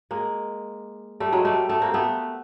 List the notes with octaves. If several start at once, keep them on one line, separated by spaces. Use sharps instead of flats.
G#3 A#3
G3 A3
F#3 G#3
G3 A3
A3 B3
A#3 C4
A3 B3